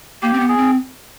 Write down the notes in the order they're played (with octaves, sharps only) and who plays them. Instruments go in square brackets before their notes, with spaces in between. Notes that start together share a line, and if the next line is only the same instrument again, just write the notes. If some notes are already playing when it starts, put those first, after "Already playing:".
[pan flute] A#3 [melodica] G4
[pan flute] C4
B3
[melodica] G#4
[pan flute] C4